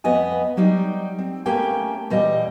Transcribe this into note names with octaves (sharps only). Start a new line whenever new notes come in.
F2 B3 D#5 G#5
F#3 G3 D#4
C4
A3 A#3 C#4 G4 G5 G#5
E2 A#2 G3 D#5